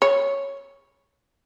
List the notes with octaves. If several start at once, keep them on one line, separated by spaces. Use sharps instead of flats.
C#5